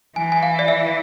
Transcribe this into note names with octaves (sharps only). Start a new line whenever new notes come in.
E3 G#5
G#5
F5
D5
E5